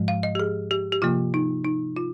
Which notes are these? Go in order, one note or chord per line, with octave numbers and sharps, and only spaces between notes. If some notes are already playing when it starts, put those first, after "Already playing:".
Already playing: G#2 F3 G#3
F5
D#5
G4
G#4
G4
G4
C3 F3 A#3 F4
D#4
D#4
F4